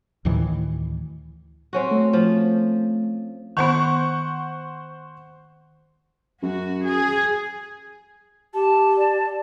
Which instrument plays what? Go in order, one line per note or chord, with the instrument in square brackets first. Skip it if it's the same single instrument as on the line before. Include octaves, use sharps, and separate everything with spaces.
[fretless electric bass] D2 A2 D#3 E3
[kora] C4 C#4 F#4
[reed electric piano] A3
[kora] F3
[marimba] D#3 B3 [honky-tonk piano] C5 F#5 C#6
[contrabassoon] F#2 [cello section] F#4
[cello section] G#4
[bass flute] G4 [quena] A5
[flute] D5